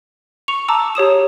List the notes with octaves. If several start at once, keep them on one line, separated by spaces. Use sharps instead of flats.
C#6 C#7 F7
A5 A#5 D6 E6
G4 C#5 D#6 E7